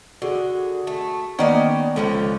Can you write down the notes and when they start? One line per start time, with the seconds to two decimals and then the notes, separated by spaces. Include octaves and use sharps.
0.22 D3 F#4 G#4
0.87 A3
1.39 D#3 A#3 B3 C#4 D5 D#5
1.96 C#2 D3 F3 C#4